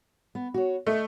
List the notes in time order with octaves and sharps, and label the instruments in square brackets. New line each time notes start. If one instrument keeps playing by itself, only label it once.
[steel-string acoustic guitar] B3
F#4 C#5
[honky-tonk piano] A3 [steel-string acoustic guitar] D#5